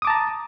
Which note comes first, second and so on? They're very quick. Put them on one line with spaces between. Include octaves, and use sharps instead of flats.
D#6 D6 A5 A#5